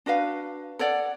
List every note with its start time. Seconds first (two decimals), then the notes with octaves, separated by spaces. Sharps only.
0.06 D4 F#4 B4 F5
0.79 A4 C#5 D5 F#5